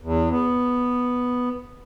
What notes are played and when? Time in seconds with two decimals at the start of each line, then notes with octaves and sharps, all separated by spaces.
0.01 E2
0.30 B3